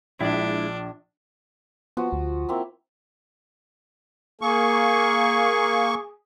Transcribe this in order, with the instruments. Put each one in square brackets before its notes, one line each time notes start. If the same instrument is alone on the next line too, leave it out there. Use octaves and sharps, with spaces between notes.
[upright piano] A#1 [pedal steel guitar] G#3 E4 [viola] D4
[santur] F3 F#4 [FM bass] B3
[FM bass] D2
[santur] A#3 C4 E4
[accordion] A#3 C#6 [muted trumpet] G#4